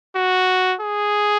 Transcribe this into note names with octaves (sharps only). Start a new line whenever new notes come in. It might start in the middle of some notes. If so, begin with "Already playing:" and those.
F#4
G#4